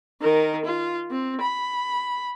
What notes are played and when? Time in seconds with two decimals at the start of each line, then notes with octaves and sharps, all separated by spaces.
0.21 D#3 A#4
0.65 F4
1.10 C4
1.41 B5